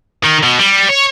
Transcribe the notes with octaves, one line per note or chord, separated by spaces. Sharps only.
D#3
B2
G3
C#5